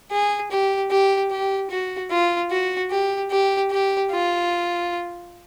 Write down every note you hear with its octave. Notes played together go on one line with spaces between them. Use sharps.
G#4
G4
G4
G4
F#4
F4
F#4
G4
G4
G4
F4